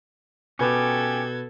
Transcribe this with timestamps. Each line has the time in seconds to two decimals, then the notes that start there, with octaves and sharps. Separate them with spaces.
0.59 B2 C#4 G4 A4 B4 G#6